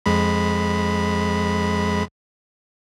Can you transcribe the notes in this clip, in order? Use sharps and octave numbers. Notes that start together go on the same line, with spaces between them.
F2 G#3 B5